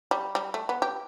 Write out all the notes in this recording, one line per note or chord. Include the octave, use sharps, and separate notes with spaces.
G3
G3
A3
B3
G4